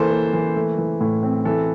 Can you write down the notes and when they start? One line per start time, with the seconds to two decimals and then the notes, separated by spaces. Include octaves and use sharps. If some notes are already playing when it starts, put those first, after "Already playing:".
Already playing: E3 A#3 A4 C5
0.11 A#3
0.33 E3
0.56 A3
0.78 E3
1.01 A2
1.23 C4
1.45 E3 A4